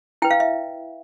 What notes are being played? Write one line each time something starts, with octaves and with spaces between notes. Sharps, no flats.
E4 B4 G5
F5
E5